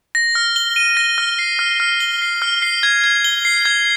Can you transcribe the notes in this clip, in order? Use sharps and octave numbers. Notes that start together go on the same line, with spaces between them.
A#6
F6
G7
D#7
A#6
F6
C7
F6
F6
G7
C7
F6
C7
G#6
G#6
G7
C7
G#6